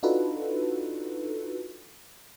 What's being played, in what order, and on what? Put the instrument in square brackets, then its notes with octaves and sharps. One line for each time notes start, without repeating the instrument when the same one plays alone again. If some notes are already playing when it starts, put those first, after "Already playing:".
[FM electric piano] D4 D#4 F4 F#4 A4 B4